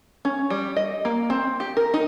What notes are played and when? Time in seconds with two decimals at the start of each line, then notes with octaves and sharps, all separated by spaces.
0.25 C#4
0.50 G3
0.76 D#5
1.05 A#3
1.30 C4
1.60 G4
1.77 A#4
1.94 D#4